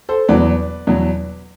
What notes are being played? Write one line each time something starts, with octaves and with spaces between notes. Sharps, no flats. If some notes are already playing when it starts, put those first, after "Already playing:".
A4 C5
E2 B2 F#3 B4 D5
E2 B2 F#3